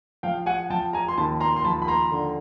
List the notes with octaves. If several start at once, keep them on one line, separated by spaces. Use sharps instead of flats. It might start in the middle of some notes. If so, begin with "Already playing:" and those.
F3 F5 G5
F#5 G#5
F3 G5 A5
G#5 A#5
C6
D#2 A5 B5
A#5 C6
C6
F3 A5 B5
B5
A#5 C6
D3